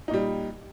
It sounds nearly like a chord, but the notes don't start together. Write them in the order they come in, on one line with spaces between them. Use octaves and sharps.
D#4 A#2 G3